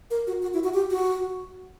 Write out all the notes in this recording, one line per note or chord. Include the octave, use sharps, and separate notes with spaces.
A#4
F#4
F#4
E4
F#4
G4
F#4